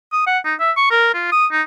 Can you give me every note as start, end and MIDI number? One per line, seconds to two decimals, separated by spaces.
0.13 0.22 87
0.27 0.38 78
0.45 0.54 63
0.60 0.71 76
0.77 0.88 85
0.91 1.10 70
1.14 1.27 65
1.32 1.46 87
1.52 1.62 63